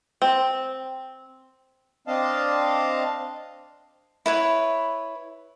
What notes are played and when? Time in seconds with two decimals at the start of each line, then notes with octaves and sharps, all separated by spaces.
0.22 C4
2.08 C4 D4 D#5 F5 A5
4.26 E4 B4 C#5